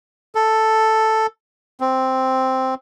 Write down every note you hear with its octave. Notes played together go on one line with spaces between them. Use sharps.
A4
C4